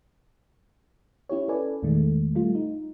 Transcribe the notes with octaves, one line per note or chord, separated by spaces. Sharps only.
C#4 E4 G4 C#5
C#4 A4 B4 D5 G#5
E2 A#2 D#3 G#3 A3
G3 A3 F4
D#4